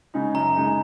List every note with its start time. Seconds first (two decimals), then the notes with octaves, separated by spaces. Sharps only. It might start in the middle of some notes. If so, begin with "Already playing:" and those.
0.14 C#3 G#3 D#4
0.34 F#2 A#5
0.56 C#3 G#3 D#4